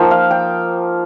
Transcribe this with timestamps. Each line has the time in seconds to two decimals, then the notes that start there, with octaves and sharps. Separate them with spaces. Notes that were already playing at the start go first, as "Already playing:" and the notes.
Already playing: F3 A#3 D#4 G5
0.11 F5
0.31 G5